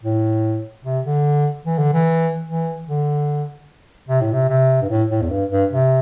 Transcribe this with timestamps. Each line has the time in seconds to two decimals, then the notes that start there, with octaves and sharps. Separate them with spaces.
0.03 A2
0.85 C3
1.05 D3
1.66 E3
1.79 D3
1.93 E3
2.47 E3
2.87 D3
4.09 C3
4.21 A2
4.33 C3
4.49 C3
4.82 G2
4.90 A2
5.11 A2
5.22 E2
5.30 G2
5.51 G2
5.71 C3